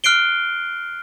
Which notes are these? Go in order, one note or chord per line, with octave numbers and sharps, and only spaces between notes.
F6 F#6 C7 D7 G7